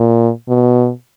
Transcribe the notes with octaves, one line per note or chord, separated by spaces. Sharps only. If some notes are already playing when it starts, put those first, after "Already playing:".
Already playing: A#2
B2